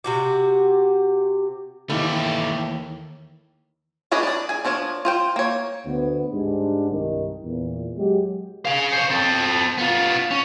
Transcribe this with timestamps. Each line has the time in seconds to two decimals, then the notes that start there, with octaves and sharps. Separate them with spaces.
0.04 C3 F#4 G4
1.90 D#2 D#3 E3 A3 G4
4.11 C#4 D4 G#4 B4 D#5
4.23 D4 D5
4.49 G#4 G#5
4.65 F3 D4 A#4 C#5
5.05 F4 C5 G5
5.36 A#3 C#5
5.86 D2 B3
6.32 G#2 G3 D4
6.90 C2 G2 D#3
7.44 E2 A#2
7.97 F#3 G#3 G4
8.65 G#4 F5
8.93 C5 C#5
9.10 C4 A4
9.78 B3 F4
10.31 C#4